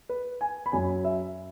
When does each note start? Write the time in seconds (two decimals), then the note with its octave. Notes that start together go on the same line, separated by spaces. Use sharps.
0.09 B4
0.41 G#5
0.66 B5
0.72 F#2 F#3 G#5
1.05 E5